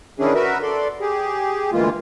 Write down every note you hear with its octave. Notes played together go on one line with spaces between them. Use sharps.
D#3 C#4 D4 E4 G#4
F#4 A#4 B4 E5
A4 D5 C6
G4 G#4
D2 E3 G#3 A#3 F4